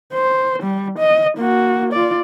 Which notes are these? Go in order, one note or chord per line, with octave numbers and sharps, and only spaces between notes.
C5
G3
D#5
A#3 F#4
F4 D5